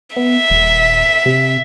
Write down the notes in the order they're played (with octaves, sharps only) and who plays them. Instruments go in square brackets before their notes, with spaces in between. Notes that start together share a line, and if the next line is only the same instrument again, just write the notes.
[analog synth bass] B3 [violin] E5
[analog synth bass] D#1
C3